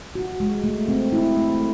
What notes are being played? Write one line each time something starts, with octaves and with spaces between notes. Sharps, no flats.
F#4
G#3
A3
C4
E4
A3